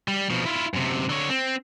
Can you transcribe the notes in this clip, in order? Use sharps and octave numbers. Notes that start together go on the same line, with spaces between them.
G3
B2 F3
E4 F4
F#2 C3
D3 C#5
C4